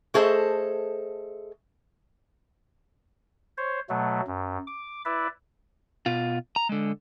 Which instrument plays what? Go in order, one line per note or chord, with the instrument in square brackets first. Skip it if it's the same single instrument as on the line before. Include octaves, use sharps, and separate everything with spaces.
[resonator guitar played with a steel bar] A3 G#4 A4 C5 D#5
[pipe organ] C5 C#5
B2 F#3 A3
F#2
D6
E4 B4 D5 E5
[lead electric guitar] B2 F4
A#5
D3 G#3